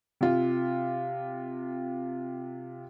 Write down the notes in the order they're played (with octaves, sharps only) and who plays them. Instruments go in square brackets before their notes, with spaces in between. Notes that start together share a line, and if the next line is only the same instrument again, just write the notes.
[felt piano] C3 F4